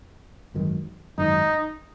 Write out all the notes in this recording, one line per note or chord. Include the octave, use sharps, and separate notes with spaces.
G#1 F#2 D#3
G#1 F#2 D#3 D#4